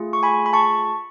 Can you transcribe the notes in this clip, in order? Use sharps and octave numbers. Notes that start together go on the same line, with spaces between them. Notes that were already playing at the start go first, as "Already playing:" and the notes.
Already playing: A3 F4 G#4
C#6
G#5 B5
B5
A5 C#6